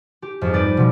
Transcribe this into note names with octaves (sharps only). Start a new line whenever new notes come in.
G4
F2 G#2
G3 B4 D5 G6 D#7
B2 F3